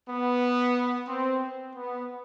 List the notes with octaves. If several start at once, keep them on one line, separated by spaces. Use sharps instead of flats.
B3
C4
B3